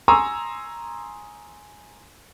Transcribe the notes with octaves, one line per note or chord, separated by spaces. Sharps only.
G#5 A#5 C6 C#6 D#6 E6